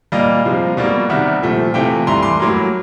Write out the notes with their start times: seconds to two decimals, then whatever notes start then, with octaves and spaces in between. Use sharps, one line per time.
0.12 A#2 G3 A#3 D#5 F5
0.45 C3 F3 G#3
0.77 B2 G3 A#3
1.10 C3 D#3 G3 E5 F#5
1.42 A#2 F3 A3
1.74 C3 E3 A3 F5 G5
2.07 G2 E3 A3 A#5 C6
2.22 C6 D6
2.40 A2 F#3 A#3